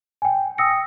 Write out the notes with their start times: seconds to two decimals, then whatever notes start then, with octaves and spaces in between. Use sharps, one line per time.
0.22 G5 G#5
0.58 G5 D#6 E6 A#6 C#7